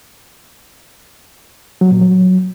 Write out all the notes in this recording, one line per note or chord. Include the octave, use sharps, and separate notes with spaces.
F#3
A#2
F#3